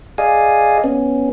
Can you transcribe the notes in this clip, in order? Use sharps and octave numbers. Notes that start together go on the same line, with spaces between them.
G#4 D5 D#5 F5 G#5
B3 C#4